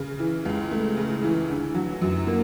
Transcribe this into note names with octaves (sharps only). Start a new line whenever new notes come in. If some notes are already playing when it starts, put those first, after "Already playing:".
Already playing: C#3
E3
C#2
A3
C#3
E3
D3
F#3
F#2
A#3